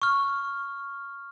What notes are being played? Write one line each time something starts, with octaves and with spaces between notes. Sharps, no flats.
C#6 F6